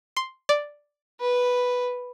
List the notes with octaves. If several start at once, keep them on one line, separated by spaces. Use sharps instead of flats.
C6
D5
B4